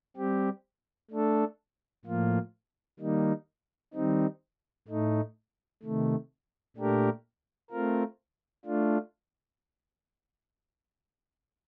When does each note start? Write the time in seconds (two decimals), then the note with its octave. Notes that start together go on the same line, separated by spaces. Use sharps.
0.16 G3 C4 G4
1.10 A3 D4 A4
2.05 A2 F3 A#3 F4
2.99 D#3 G3 A#3 D#4
3.93 D#3 G3 C4 D#4
4.88 A2 A3 D#4
5.82 C3 D#3 A3
6.76 A#2 A3 D4 G4 A#4
7.70 A3 C4 F4 A#4
8.65 A3 D4 F4